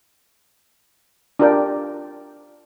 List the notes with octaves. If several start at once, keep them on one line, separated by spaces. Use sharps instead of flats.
D4 F4 G4 A#4 D5 G5